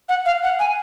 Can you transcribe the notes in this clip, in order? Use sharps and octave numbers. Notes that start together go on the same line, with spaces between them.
F#5
F5
F#5
G#5